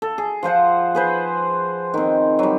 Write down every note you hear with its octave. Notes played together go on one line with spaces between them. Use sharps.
A4
G#4
F3 F4 C5 F#5
G#4 B4 C5
D#3 C4
F#3 G3